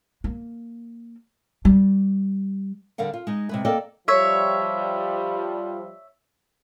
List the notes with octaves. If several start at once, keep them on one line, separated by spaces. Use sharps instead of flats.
A#3
G3
D3 G3 A#4 F5 F#5
F4
G#3 D#4
C3 G#3 B4
A#3 A4 A#4 D5 D#5 G5
F3 G3 C#5 E5